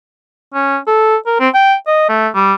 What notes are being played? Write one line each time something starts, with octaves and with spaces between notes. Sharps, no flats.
C#4
A4
A#4
C4
G5
D#5
A3
G3